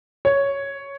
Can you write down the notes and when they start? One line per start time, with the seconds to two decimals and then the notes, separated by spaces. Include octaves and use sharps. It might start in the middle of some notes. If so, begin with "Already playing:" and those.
0.25 C#5